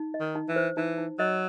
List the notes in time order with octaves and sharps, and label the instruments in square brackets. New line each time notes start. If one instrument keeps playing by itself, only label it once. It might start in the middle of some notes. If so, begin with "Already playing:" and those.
Already playing: [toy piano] D#4
D#5
[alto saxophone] D#3
[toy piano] D#4
[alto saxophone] E3
[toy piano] C5
[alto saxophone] E3 [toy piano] D#4
[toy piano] D#4
[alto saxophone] F#3 [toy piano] D#5